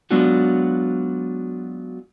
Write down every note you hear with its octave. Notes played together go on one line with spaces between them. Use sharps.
F#3 G#3 B3 D4 F4 F#4